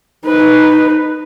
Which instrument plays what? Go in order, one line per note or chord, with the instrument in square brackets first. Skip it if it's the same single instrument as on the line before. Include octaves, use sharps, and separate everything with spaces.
[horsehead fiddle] D#4 B4